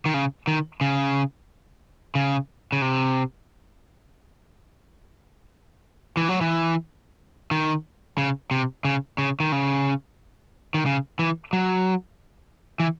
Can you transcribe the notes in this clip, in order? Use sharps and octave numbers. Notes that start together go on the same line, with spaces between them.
D#3
C#3
D#3
C#3
C#3
C#3
C3
E3
F#3
E3
D#3
C#3
C3
C#3
C#3
D#3
C#3
D#3
C#3
E3
F#3
E3